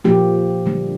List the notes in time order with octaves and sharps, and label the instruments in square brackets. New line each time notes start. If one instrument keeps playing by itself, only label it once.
[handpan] A#2 F3 A#3 G4
D3 G3 A#3